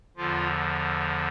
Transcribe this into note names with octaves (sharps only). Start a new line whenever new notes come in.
E2 D3 F3 F4